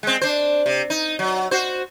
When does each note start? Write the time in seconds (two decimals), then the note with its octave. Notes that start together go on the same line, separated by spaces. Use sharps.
0.03 G#3 C4
0.21 D4 C5
0.66 C3
0.90 D#4
1.19 F#3
1.51 F#4 C5